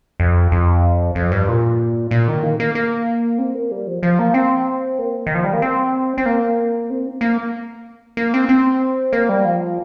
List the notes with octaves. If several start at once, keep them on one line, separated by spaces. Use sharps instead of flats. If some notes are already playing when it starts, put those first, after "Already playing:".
F2
F2
F2
G2
A#2
A#2
D#3
A#3
A#3
A#3
C4
A#3
G3
F3
F3
A#3
C4
A#3
D#3
F3
G3
A#3
C4
C4
A#3
C4
A#3
A#3
C4
C4
A#3
G3
F3